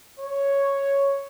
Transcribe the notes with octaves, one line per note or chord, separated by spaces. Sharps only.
C#5